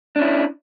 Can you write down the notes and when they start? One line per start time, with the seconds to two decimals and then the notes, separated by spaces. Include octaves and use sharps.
0.16 D4
0.19 C#4
0.22 E4